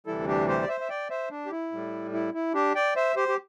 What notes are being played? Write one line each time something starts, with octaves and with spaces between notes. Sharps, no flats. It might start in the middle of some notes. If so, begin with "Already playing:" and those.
D2 C3 E3 G3 E4 A4
D4 G4
G4 C5
D5
C5 E5
E5
D5 G5
C5 E5
D4
G4
E4
A2 G3
E4
E4
D4 G4
D5 G5
C5 E5
G4 C5
G4